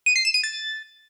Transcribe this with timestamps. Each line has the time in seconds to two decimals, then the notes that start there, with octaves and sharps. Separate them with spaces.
0.06 D#7
0.16 C7
0.25 E7
0.34 D#7
0.43 A6